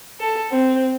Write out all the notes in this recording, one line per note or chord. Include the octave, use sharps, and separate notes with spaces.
A4
C4